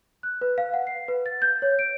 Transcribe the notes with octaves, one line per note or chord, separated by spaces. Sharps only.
F#6
B4
F5
F#5
C7
B4
A6
G6
C#5
D7